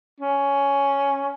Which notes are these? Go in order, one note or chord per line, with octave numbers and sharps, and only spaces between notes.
C#4